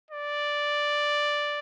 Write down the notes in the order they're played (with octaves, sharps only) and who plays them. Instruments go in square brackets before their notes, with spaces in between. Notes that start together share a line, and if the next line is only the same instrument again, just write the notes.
[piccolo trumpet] D5